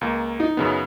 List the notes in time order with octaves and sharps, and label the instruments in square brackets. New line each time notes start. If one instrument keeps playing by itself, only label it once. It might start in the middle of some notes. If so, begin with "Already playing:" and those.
[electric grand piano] C#2 A#3
[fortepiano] D#4
[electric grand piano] F#2 C#3 B3